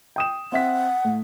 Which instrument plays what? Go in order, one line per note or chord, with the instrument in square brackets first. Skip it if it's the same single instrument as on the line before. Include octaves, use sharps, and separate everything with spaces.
[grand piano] G5 D#6 E7
[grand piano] C4 E5 B6 [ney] F#5
[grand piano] A2